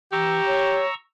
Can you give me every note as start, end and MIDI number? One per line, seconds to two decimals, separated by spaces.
0.12 0.41 52
0.12 0.82 67
0.12 0.94 82
0.12 0.94 85
0.12 0.94 88
0.46 0.86 73